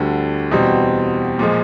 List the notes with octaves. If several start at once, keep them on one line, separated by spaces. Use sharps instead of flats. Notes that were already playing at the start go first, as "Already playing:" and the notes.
Already playing: D2 D3 G3
E2 B2 G3 C4
A#2 F3 G#3